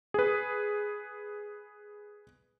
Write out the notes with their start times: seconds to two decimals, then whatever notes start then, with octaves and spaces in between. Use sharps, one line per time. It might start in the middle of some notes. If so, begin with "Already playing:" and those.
0.14 G#4 B4